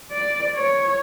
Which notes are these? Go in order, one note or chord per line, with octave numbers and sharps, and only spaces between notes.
D5
C#5